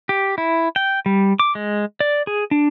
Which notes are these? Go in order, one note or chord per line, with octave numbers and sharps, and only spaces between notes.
G4
E4
G5
G3
D6
G#3
D5
G#4
D4